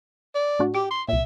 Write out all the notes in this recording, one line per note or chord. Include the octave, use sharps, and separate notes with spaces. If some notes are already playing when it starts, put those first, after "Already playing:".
D5
A2 D4 F#4
G4 D6
C6
C2 A#2 E5